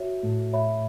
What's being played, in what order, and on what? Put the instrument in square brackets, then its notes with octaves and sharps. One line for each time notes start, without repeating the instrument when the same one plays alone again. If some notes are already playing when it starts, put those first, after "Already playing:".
Already playing: [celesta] F#4 C#5 E5
[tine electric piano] A2 A3
[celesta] C#5 E5 B5